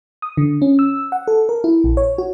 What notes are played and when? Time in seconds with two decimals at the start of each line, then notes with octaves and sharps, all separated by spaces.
0.22 D#6
0.37 D3
0.62 C#4
0.79 E6
1.12 F#5
1.28 A4
1.49 A#4
1.64 E4
1.84 A#1
1.97 C#5
2.18 F#4